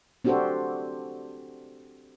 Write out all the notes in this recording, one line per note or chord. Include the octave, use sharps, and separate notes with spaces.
C4 D4 F#4 G4 A4 C5